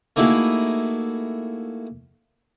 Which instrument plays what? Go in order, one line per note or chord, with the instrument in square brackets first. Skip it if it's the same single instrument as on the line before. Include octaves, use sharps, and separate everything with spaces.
[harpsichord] A3 A#3 D#4 E4 F#4 G#4